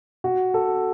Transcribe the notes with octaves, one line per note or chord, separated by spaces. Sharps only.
F#4
A4